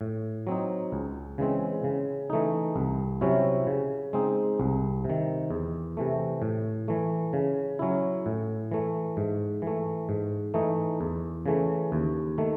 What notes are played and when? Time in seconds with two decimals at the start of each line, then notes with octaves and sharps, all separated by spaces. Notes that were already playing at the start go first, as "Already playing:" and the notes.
0.01 A2
0.47 F#3 C4 D#4
0.92 C#2
1.38 C#3 E3 G#3 C4
1.84 C#3
2.30 E3 A3 D#4
2.76 C2
3.21 C3 F#3 C#4 E4
3.67 C#3
4.13 G#3 C4 D#4
4.60 C2
5.04 C3
5.10 D#3
5.51 E2
5.97 C3 E3 A3
6.42 A2
6.88 E3 A3
7.33 C#3
7.79 F#3 C#4 E4
8.26 A2
8.72 E3 A3
9.17 G#2
9.62 E3 A3
10.09 G#2
10.54 E3 A3 D#4
11.01 E2
11.46 C#3 E3 A3
11.92 D#2
12.38 D#3 A3